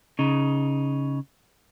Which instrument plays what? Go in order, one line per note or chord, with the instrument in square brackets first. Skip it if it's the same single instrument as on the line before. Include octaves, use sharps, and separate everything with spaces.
[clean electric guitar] C#3 D#4